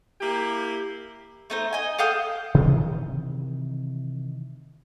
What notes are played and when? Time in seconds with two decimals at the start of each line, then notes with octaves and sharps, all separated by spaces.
0.21 A#3 E4 G4
1.50 A3 D#4 C5
1.73 D#5 G#5
1.99 A4 F5 G5 D#6
2.54 C3 D#3 E3